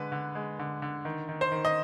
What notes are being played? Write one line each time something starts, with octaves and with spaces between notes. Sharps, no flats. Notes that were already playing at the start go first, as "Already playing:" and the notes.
Already playing: D3 G#3 B4
D3
G#3
D3
D3
D#3
D#3
C5
D#3
D#5